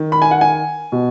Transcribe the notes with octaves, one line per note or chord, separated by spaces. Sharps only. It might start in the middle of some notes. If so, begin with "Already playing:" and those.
Already playing: D#3
B5
G#5
F#5
G#5
B2